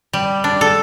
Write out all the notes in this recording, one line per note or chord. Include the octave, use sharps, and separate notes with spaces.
G3
D4
A4